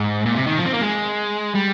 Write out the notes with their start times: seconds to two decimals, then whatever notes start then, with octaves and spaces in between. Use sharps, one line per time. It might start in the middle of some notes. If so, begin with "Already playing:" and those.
Already playing: G#2
0.26 A#2
0.35 C3
0.47 D#3
0.58 F3
0.65 C4
0.73 A#3
0.81 G#3
1.55 G3